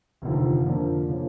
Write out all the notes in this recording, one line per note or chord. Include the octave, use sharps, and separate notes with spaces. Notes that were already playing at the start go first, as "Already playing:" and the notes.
F1 D#2 D3 F3
F2 D3 F3 A#3 D4
C#3 F3 A#3